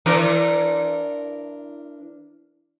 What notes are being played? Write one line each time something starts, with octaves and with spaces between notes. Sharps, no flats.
E3 D4 A#4